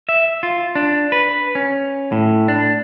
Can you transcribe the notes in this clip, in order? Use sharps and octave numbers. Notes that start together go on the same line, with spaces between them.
E5
F4
D4
B4
C#4
A2
D4